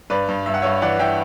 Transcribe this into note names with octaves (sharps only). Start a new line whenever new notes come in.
G2 B4 D5
G2
G2 E5
F#5
G2 C#5 E5
E3 D5 F#5
E3 E5 G5